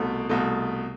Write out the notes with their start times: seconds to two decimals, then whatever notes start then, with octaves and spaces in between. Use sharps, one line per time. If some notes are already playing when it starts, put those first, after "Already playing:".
Already playing: C2 B2 A3
0.29 C2 B2 A3